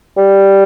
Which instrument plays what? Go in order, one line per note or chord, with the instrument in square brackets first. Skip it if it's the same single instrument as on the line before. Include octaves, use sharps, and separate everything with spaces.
[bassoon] G3